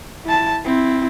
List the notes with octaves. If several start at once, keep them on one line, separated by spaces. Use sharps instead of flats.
E4 A5
C4 E4